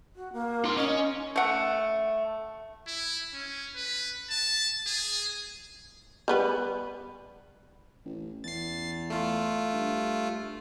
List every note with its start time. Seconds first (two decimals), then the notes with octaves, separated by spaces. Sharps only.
0.16 F#4
0.33 A#3
0.64 D#4 C6
0.77 C#4 D#5
1.36 A3 F#5
2.87 E4
3.34 C#4
3.76 B4
4.30 A5
4.87 G#4
6.28 G3 B3 B4
8.05 A1
8.44 E2 A6 C7
9.10 A3 F4
9.72 G2